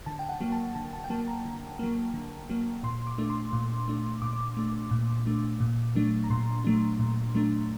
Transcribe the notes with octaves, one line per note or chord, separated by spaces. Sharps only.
D3 A5
G5
F#5
F#3 A#3
A5
D3 A5
A5
G5
F#3 A#3 A5
A#5
D3
F#3 A#3
D3
F#3 A#3
A#2 C6
D6
A3 D4
C6
A#2
A3 D4
A#2 D6
A3 D4
A#2
A3 D4
A#2
F#3 A3 D4
A#5
A#2 C6
F#3 A3 D4
A#2
F#3 A3 D4